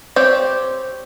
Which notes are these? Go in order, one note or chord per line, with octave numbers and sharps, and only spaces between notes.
C4 G4 C#5 D5